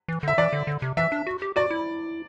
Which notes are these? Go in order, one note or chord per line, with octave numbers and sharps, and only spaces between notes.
E3
D3 E5
E3 D5
D3
D3
C3
E3 E5
D4
F#4
G4
F#4 D5
E4